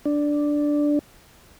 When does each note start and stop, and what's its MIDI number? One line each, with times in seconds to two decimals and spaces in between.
0.05 0.99 62